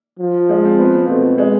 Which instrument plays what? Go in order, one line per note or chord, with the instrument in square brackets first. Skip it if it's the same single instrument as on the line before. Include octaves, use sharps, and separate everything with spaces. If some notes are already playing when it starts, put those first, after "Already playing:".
[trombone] F3
[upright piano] G#3
C4
B3
C4
[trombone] B2 [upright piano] A3
[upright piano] G#3